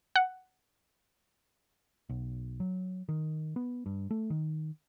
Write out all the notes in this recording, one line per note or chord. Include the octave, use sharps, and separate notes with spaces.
F#5
B1
F#3
D#3
B3
G2
A3
D#3